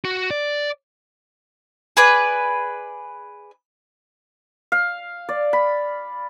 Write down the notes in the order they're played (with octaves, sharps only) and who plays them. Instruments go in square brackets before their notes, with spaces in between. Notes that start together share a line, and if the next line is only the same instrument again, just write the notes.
[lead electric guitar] F#4
D5
[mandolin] G#4 B4 D5
[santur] F5
D5
B5